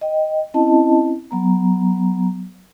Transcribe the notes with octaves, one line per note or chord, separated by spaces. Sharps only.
D#5 G5
C4 C#4 E4 D#5 A5
F#3 B3 A#5